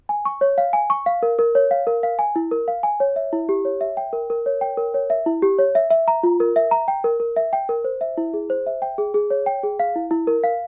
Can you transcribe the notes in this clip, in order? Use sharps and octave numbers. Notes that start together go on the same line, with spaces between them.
G#5
C#6
C#5
F5
G#5
C#6
F5
A#4
A#4
C#5
F5
A#4
F5
G#5
E4
A#4
F5
G#5
C#5
E5
E4
G4
C#5
E5
G5
A#4
A#4
C#5
G5
A#4
C#5
E5
E4
G4
C#5
E5
E5
A#5
F4
A#4
E5
A#5
G5
A#4
A#4
E5
G5
A#4
C5
E5
E4
G#4
C5
E5
G5
G#4
G#4
C#5
G5
G#4
F5
E4
E4
A#4
F5